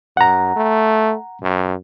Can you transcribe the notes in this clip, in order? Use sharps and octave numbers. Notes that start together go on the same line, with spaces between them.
F#2 F#5 A#5
A3
F#2